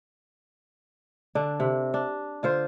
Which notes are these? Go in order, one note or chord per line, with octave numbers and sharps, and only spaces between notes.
D3 D4
C3
D4
D3 F4 C5